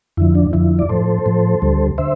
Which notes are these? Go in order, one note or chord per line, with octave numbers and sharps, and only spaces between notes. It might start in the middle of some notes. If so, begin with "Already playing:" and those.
F2 D3 F3 E4
D4
F2 D3 F3 E4
D5
A2 F3 A4 C5
A2 F3
D2 D3 G3
D3 C5 E5